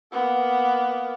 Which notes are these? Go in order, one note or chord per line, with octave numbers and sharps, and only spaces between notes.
A#3 B3